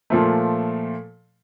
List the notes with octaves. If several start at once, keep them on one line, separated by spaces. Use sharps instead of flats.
A#2 F3 A3